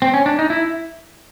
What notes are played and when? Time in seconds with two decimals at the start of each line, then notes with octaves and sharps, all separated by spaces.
0.02 C4
0.14 C#4
0.26 D4
0.39 D#4
0.50 E4